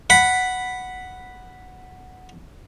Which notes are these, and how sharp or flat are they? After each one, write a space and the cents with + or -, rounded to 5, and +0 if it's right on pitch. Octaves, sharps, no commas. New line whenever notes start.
F#5 +0 B5 +0